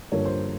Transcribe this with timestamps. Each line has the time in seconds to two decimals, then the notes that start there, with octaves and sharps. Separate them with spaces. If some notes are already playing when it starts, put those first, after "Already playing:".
0.12 G2 D3 F3 A#3 C#5
0.25 C5